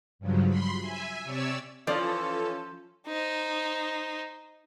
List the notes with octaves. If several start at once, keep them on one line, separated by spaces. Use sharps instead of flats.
G2 C#3 F3 F#3
B5 C6
E5 G#5
C3 C#5 D5 E6
E3 F3 C#4 F4 A4 D5
D#4 C5